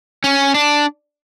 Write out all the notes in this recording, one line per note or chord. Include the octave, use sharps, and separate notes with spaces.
C#4
D4